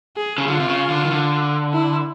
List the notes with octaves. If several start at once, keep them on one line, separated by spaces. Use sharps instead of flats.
G#4
C#3
D3 F4
C3
C#3
D3
D#3
D3
E4